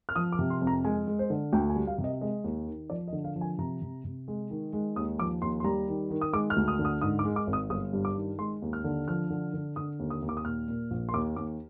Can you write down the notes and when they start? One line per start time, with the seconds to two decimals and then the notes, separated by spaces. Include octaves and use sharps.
0.09 F6
0.16 F3 D#6
0.32 D6
0.39 C3
0.50 C6
0.61 F2
0.67 A#5
0.85 G#3 G#5
1.07 G#3
1.19 C5
1.30 D3
1.53 D2 G5
1.70 G#5
1.76 G3
1.87 F5
1.98 C3
2.04 D#5
2.21 G#3 D#5
2.44 D#2
2.67 D#3
2.90 F3 D5
3.08 D#5
3.13 D3
3.24 F5
3.36 F3
3.41 G#5
3.58 C3 A#5
3.82 C3
4.04 C3
4.28 G#3
4.50 D#3
4.73 G#3
4.96 D#2 D#6
5.19 F3 D6
5.42 D#2 C6
5.60 C6
5.64 G3 A#5
5.88 D#3
6.10 D#3
6.21 D#6
6.33 G#3 D6
6.50 F6
6.56 D2
6.68 D#6
6.79 D3
6.85 D#6
7.01 G#2 D#6
7.19 D6
7.25 G#3
7.36 D6
7.47 G#1
7.53 D#6
7.70 G1 D#6
7.93 G2
8.05 D6
8.17 D#3
8.39 G#3 C6
8.62 D#2
8.73 F6
8.84 D3
9.08 F3 F6
9.30 D3
9.54 D3
9.76 D3 D#6
9.99 D#2
10.10 D#6
10.22 D#2
10.29 D6
10.37 D#6
10.45 A#2 F6
10.68 A#2
10.91 A#1
11.09 C6
11.14 D#2 D6
11.36 D#2 D6